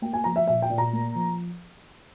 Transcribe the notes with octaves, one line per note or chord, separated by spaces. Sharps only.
A#3 G5
G#5
F3 A#5
E5
A#2 E5
G5
A#2
A#5
A#3
F3